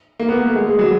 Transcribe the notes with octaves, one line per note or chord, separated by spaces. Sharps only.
A#3
B3
A#3
A3
G#3
G#3
F#3